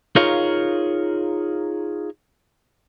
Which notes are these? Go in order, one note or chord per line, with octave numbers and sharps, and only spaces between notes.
D#4 F4 G#4 A#4 C#5 F5